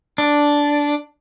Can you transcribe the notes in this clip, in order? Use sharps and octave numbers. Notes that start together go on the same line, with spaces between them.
D4